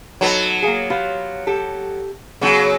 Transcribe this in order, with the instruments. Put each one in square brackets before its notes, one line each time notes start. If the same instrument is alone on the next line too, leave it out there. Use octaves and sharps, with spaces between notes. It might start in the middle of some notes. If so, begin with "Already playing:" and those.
[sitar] F#3 B3 [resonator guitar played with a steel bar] D#4 A4 B4
[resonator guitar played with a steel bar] A#3 G#4
F4 G4 B4
G4 A4
[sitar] C#3 F#3 [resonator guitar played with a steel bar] B3